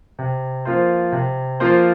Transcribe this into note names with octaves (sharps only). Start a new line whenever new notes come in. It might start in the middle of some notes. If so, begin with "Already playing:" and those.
C3
F3 A#3 F4 C5
C3
F3 A#3 F4 C5